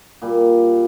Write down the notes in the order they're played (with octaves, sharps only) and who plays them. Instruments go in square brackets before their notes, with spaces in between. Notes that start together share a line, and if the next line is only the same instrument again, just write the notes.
[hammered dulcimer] A#2 G3